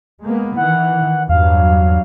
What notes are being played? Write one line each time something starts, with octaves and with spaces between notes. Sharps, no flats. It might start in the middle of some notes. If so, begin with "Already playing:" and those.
G#3 A#3 B3
D#3 E3 F#5
E2 G2 F#3 F5